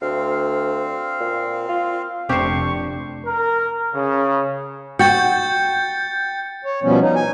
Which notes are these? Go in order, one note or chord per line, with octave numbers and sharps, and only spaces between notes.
D2 C4 F5
A#2
F4
F1 C3 C4 D4 G4 C5 C#6
A#4
C#3
F#4 G5 G6 A6 C#7
C#5
B2 F3 G3 B3 C#4
D#4
G#5